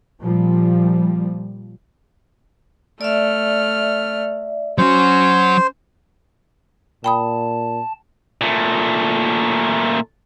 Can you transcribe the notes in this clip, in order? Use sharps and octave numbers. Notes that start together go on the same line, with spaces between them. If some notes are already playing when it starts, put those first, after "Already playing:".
A#2 F3 G3
A3 D5 E5 F6
F#3 C#4 F#4 C5
A#2 G5 A5 B5 D#6
A#2 A3